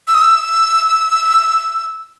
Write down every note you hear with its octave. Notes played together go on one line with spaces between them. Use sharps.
E6
D#6
E6